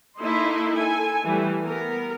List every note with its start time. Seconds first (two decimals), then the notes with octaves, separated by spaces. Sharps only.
0.19 A#3 D#4 E4 A4 D#5 C6
0.73 A4 G#5
1.24 E3 G3 A3
1.62 B3 A#4